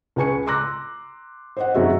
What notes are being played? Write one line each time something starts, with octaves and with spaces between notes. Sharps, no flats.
C#2 B4 G#5 C#6 C#7
A#5 C6 D6 E6 F#6 A#6
C5 D#5 F#5
F1 F#2 D#4 F#4 G#4 E5